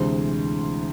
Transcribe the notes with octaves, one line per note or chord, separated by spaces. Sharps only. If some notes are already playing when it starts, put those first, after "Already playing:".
Already playing: D2 C3 E3 G#3 C5